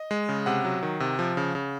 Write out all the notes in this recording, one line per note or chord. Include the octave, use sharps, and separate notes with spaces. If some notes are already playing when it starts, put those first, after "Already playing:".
Already playing: D#5
G#3
C#3
C3 F#5
F#3
D#3
C3
F3
C#3
C#3